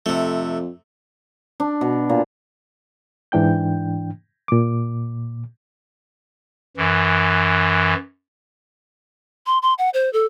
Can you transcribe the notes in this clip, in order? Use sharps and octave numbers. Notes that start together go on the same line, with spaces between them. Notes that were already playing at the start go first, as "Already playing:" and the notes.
F2 C3 A3
D4
B2
A#2
G#2 E3 D4 G5 G6
A#2 D6
F#2 E3
C6
C6
F#5
C5
A4